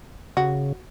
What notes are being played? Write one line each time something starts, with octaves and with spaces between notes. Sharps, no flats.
C#3 F#4